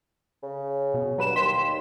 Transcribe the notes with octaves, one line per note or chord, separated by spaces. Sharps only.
C#3
B2
G2 F#3 B4 E7
D#2 C6 B6 E7